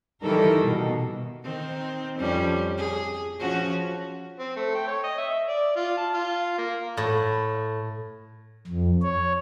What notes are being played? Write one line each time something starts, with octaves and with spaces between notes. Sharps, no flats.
D#3 E3 G3 A4 A#4
B2
D#3 C4
F2 G3 C#4
G#4
F3 C#4 F#4
C4
A3
G5
C#5
D#5
E5
D5
F4
A5
F4
A#3
A2
F2
C#5